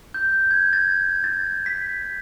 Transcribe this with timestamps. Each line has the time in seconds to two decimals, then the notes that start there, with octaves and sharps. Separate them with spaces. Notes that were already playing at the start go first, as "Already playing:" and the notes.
0.14 G6
0.51 G#6
0.73 A6
1.24 A6
1.66 B6